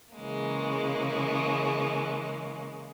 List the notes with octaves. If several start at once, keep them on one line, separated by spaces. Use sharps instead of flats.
C#3 E3 G#3 A#3